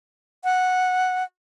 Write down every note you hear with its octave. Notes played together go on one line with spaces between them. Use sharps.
F#5